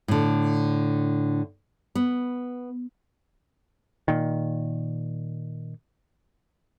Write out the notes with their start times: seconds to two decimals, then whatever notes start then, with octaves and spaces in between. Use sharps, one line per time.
0.08 A2 D3
1.95 B3
4.08 A#2 D#3